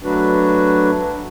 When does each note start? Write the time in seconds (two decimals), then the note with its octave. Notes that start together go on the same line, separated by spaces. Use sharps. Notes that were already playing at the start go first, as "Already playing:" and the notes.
0.02 F#3 A3 D4 F#4 B4